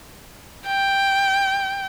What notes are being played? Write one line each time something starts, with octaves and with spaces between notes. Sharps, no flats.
G5